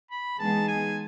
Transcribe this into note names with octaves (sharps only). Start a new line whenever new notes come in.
B5
E3 G#3 B3 D#4 G#4 A5
G#5